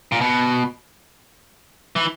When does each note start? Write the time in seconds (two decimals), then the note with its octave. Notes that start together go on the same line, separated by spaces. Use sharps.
0.12 A#2
0.21 B2
1.96 E3